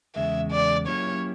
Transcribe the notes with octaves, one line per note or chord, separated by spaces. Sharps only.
E2 C#3 G#3 E5
D5
F#3 A#3 C#4 E4 G4 C#5